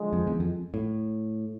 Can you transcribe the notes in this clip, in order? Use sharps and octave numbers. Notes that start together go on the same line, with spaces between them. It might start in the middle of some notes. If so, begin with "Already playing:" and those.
Already playing: D3 F3 G#3
F2
E2
F2
A2